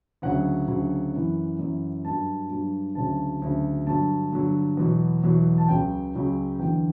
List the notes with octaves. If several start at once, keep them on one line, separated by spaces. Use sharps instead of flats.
D2 C#3 F#3 F#5
D2 C#3 F#3
F#2 E3
F#2 E3
G2 F#3 A5
G2 F#3
D2 C#3 F#3 A5
D2 C#3 F#3
G2 D3 F#3 A5
G2 D3 F#3
E2 B2 F#3
E2 B2 F#3
A5
C#2 C#3 F#3 G5
C#2 C#3 F#3
E2 D3 F#3 G5